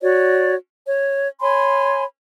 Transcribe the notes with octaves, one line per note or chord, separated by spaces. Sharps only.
F#4 C#5 D5
C#5
C#5 G#5 B5 C6